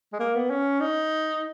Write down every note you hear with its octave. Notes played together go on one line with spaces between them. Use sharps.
G#3
A#3
B3
C#4
D#4